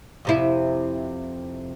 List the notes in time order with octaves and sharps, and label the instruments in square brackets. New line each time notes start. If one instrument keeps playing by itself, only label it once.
[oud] F2 C3 E4